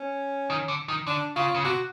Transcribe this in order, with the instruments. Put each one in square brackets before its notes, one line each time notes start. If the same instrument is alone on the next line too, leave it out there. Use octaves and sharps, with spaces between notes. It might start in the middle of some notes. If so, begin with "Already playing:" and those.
Already playing: [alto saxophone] C#4
[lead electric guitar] D#3
D3
D#3
[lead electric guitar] D3 [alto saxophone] D4
[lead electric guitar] C#3 [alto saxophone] F4
[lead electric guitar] C#3
[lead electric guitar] C3 [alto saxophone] F#4